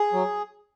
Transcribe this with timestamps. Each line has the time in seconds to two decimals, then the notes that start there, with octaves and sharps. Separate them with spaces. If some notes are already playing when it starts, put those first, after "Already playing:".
Already playing: G#4
0.13 F#3